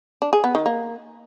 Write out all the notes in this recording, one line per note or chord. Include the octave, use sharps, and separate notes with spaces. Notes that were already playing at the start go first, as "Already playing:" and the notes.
D4
G#4
B3
D#3
A#3